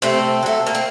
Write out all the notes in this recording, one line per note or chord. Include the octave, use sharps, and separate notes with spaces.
C3 A3 C4
F#3 A3
A#3
C4